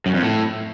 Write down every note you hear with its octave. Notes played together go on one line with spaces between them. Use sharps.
F#2
F2
A2